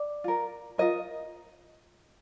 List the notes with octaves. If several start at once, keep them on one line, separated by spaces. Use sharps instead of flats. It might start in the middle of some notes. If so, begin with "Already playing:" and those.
Already playing: D5
F4 A#4
F4 A#4 D#5